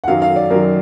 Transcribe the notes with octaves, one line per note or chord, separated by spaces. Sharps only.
F#5
F#2 D#3 F#3 F5
F5
D5
F#2 D#3 F#3 A#4